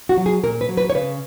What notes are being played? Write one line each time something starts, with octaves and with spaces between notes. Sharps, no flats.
F#4
F#3
G#4
A#2 A#4
B4
F#3
B4
C#5
C#3 B4